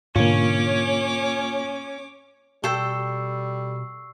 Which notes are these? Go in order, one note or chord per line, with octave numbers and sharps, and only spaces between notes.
G#2 B2 D3 A#3 C#4 F4 C#5 D6
B2 G3 A4 G5 C#6 E6 C7